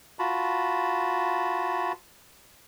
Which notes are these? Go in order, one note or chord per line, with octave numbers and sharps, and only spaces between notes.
F4 F#4 A5 B5